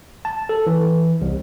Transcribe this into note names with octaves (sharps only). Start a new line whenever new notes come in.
A5
A4
E3
C2